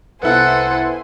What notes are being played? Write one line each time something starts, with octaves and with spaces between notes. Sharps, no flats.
C2 B3 E4 A4 C5 F#5 G#5